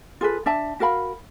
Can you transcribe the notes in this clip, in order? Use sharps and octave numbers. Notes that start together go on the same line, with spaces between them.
F4 G#4 A4 B4
D4 E5 A5
F#4 A#4 F5 B5